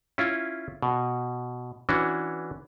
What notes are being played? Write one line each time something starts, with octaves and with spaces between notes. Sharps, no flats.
C#4 E4 F4
B2
E3 C#4 D4 F#4